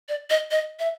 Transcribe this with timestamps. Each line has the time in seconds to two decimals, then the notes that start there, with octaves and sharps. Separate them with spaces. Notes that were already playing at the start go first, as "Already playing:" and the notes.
0.09 D5
0.30 D#5
0.51 D#5
0.79 E5